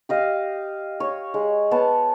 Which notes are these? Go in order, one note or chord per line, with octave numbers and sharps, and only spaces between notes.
G4 D#5 F5
C#5
G#3
B3 C#5 A5